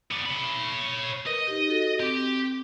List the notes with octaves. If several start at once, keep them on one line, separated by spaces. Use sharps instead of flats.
B3 D5
C#5 B5
A#4 B4 D#5
D#4 G4
F#4 A4
C4 G4 D6